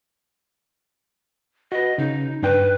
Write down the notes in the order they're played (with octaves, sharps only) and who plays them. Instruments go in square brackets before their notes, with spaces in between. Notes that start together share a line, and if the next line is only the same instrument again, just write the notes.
[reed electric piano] F#4 B4 [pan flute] D#5
[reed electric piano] C#3 [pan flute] D#4
[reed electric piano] G2 D4 G5 [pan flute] B4